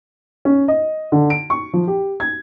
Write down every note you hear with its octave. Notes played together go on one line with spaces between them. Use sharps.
C#4
D#5
D3
D7
C#6
F3
G4
G#6